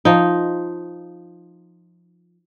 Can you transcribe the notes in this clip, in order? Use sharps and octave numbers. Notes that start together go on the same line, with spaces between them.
F3 D#4